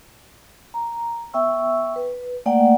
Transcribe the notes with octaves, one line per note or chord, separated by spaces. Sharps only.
A#5
B3 E5 G5 C#6 E6
B4
A3 A#3 D5 F#5 G5